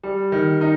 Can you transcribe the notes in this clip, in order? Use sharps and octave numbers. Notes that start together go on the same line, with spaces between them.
G3
D#3
D#4